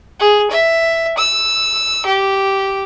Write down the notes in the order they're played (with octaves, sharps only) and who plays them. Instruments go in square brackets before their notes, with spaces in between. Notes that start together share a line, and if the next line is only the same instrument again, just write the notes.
[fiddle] G#4
E5
E6
G4